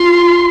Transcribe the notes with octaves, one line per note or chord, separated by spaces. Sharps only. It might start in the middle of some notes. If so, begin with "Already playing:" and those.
Already playing: F4 C6